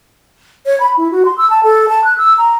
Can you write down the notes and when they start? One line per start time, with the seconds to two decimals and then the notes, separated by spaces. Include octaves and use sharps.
0.66 C#5
0.80 B5
0.97 E4
1.11 F#4
1.25 C6
1.38 E6
1.50 A5
1.63 A4
1.89 A5
2.04 F#6
2.18 E6
2.38 A#5